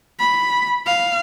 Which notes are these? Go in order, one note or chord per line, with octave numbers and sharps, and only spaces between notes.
B5
F5